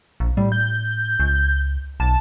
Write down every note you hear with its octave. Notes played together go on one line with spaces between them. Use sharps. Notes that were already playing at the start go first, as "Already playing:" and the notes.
A#1
A2 G3
G6
C#2
B1 A5